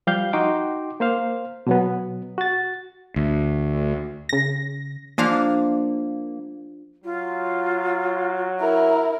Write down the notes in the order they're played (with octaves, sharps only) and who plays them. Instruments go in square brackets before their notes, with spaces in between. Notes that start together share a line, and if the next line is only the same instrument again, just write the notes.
[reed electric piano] F3 G3 G4 F5 G6
D#4 F#4 G5 C6 D6
A#3 C5 F5
B2 F#3 B3
F#4 A6
[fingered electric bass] D2
[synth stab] C#3 A#6
[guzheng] F3 D4 F5 [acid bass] A#3
[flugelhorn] F#3 [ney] F4
[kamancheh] E4 A#4 [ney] A#5